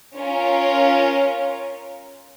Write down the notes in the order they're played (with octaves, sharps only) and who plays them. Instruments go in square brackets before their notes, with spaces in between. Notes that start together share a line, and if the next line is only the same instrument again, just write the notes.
[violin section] C#4 F4 A#4